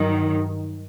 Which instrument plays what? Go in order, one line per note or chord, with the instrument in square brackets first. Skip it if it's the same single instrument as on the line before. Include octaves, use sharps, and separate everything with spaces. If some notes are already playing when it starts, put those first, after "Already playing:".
Already playing: [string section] G2 D#3 F#3